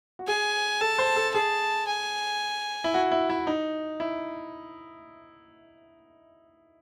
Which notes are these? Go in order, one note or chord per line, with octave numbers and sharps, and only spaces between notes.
F#4
G#4 G#5
A4 A5
C5
A4
G#4 A5
G#5
E4
F#4
E4
E4
D#4
E4